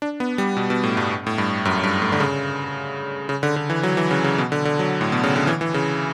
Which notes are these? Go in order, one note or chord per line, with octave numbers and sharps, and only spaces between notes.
D4
B3
G3
B2
B2
A2
G2
A2
G2
F#2
G2
A2
D3
C#3
C#3
D3
D3
E3
F#3
E3
C#3
C#3
B2
D3
D3
F#3
A2
B2
C#3
D3
E3
E3
C#3